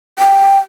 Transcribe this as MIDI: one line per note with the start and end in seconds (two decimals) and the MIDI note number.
0.19 0.59 79